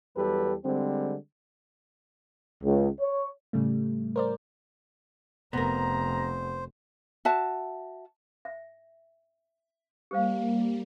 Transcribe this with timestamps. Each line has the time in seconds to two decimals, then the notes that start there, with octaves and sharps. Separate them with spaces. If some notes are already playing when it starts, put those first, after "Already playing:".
0.17 E2 F#3 G3 G4 A4 B4
0.65 D3 G3 G#3 C4
2.63 C#2
3.01 C#5
3.53 A2 C#3 G3 A3
4.16 A#4 C5 D5
5.53 F1 B3 A#4 C5 A#5
7.25 F#4 E5 A5
8.45 E5
10.11 G3 A#3 G4 C5 F5